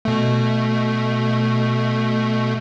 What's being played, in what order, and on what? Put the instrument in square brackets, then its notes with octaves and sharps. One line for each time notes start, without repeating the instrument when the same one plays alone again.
[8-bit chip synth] B2 A3